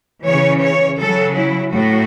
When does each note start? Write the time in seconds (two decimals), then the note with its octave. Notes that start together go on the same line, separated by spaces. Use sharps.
0.24 C#3 E3 C#5
0.62 C#5
0.99 C#3 F#3 A4
1.36 E4
1.73 A2 F#3 F#4